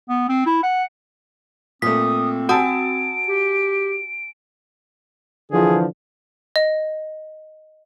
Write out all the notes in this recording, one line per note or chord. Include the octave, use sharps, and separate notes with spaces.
B3
C4
E4
F#5
A#2 A3 C4 D#6 B6
F#4 F#5 G#5 A5 D#6 E6 D7
G4
D3 E3 F3 G#4
D#5